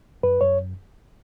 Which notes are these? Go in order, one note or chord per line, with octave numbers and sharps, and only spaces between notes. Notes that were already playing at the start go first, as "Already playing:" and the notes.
F#2 B4
F#2 C#5